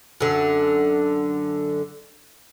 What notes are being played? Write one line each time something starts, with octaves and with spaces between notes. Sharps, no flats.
F#2 D3